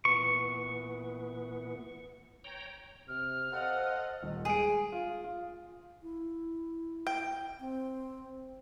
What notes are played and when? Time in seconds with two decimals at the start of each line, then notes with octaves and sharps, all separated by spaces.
0.05 A#2 E3 B3 C#6
2.44 C#5 G5 A#5
3.08 C3 F6
3.52 A4 C5 D#5 F5 F#5
4.23 D#1
4.45 G#3 G#4 D7
4.92 F4
5.24 F4
6.02 E4
7.07 G5
7.60 C4